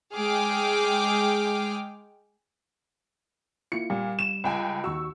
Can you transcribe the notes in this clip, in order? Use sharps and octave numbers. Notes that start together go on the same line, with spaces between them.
G#3 G#4 G5 D6 F6
A#3 E4 F4 C#7
A#2 G3
E7
C#2 G5 G#5
D#2 F#4 C#6 E6